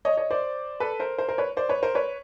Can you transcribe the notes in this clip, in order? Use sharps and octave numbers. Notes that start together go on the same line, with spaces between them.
C#5 D#5
C#5 D#5
C5 D5
A4 B4
A#4 C5
A#4 C5
A#4 C5
B4 C#5
C5 D5
B4 C#5
A#4 C5
B4 C#5